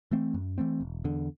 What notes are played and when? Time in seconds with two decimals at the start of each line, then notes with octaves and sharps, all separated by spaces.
0.11 E3 A3 C4
0.34 F#2
0.58 E3 A3 C4
0.80 E1
1.04 E2 D3